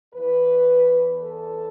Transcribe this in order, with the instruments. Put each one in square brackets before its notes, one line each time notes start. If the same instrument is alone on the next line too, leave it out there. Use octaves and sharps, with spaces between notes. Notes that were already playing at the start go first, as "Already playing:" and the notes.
[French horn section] E2 E3 B4
A4